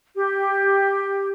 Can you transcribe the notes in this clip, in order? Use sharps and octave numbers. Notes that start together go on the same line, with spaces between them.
G4